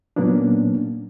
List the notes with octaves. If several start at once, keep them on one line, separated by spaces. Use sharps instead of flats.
A#2 F#3 A#3 B3 C#4 D4